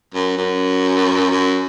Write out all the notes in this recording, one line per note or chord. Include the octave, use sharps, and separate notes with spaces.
F#2
F#2
F#2